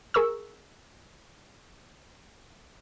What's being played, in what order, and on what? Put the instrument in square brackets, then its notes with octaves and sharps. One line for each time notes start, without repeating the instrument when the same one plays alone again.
[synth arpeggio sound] G#4 A#4 C#6 E6